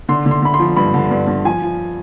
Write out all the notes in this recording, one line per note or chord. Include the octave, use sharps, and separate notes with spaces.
D3 C6
D3
C6
D3 B5
C6
F3
G2 B5
D3
G2
G2
F3 G#5
F3